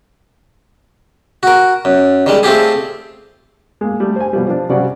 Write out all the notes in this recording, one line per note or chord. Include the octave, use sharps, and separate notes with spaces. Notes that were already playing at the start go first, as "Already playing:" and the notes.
F#4 A#4
F#2
D#3 G3 G#3
A3 C4 F4 G4 G#4
G#3 A#3
G3 A3
C5 G#5
B2 F3 G3
F3 C4 D4
C#3 F#3 G3 C4 D5 F#5